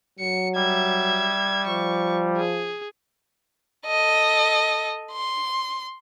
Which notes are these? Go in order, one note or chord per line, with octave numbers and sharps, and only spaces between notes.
F#3 C#7
G3 E5 G#6
F3 C#6
G#4
A4 D#5
C6